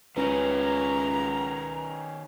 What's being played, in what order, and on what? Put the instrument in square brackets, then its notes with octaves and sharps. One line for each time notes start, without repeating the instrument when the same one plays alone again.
[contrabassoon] C#2 [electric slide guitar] D#3 C#4 [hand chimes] B4 [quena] A#5